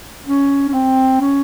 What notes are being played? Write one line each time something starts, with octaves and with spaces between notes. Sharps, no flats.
C#4
C#4
C4
C#4